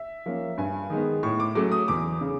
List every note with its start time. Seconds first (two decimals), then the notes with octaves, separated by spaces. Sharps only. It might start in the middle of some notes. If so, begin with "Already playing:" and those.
Already playing: E5
0.26 F3 A#3 C#4
0.57 G2 G#5
0.90 D#3 G#3 B3
1.23 A2 C#6
1.40 D6
1.55 F#3 A3 C#4 D6
1.72 D#6
1.88 E2 D6
2.21 C#3